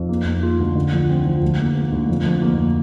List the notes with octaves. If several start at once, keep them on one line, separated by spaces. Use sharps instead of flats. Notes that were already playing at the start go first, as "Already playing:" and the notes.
Already playing: F2
A#3
A#3
F4
D2
D3
F3
C4
F3
D2
A#3
A#3
D2
F2
F2
A#3